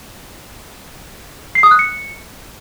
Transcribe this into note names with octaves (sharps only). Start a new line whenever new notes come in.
C7
D#6
F#6
C#7